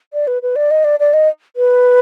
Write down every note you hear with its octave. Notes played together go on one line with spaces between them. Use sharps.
D5
B4
B4
D5
D#5
D5
D5
D#5
B4